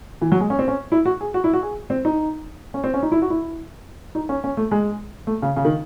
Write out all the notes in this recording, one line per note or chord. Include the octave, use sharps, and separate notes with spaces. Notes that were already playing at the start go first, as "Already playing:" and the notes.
E3
F#3
G#3
C#4
C4
C#4
E4
F#4
G#4
F#4
E4
F#4
G#4
C4
D#4
C#4
C4
C#4
D#4
E4
F#4
E4
D#4
C#4
C#4
A3
G#3
A3
C#3
C#3
D#3